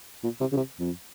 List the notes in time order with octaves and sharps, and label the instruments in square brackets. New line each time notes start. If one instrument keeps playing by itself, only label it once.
[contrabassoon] A#2
C3
C#3
C3
F2